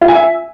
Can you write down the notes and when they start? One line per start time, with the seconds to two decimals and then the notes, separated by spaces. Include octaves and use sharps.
0.01 F4
0.08 G#5
0.15 E5